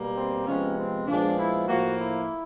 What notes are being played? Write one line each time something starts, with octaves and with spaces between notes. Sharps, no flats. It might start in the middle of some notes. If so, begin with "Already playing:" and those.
Already playing: B2 G3 A#3
C4
C3 F3 G#3 B3 C#4
C4
A#2 F3 G#3 B3 D4
E4
A2 F3 A#3 F#4
E4